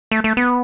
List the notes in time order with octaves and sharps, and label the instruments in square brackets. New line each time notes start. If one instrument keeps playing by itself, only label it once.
[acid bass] A3
A3
B3